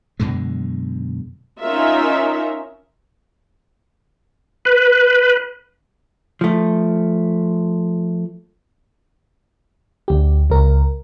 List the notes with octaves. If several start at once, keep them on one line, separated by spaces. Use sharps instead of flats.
F#2 B2 D3 G#3
C#4 D#4 F4 A#4 E5
B4
F3 A3
D2 G4
C#2 A#4